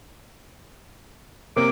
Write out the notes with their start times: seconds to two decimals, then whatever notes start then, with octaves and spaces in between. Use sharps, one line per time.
1.56 C3 A#3 D6